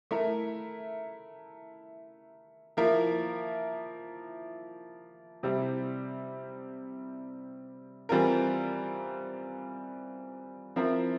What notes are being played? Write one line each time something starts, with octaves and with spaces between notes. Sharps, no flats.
A3 E4 A#4
F3 A#3 E4 A#4
C3 G3 C4 E4
E3 G3 C4 F4 A#4
F3 C4 E4 A#4